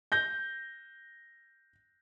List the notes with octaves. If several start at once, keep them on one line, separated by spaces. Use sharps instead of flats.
G6 A#6 G7